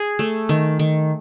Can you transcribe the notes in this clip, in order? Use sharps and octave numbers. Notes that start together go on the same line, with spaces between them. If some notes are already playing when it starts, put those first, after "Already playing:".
Already playing: G#4
A3
D#3
D#3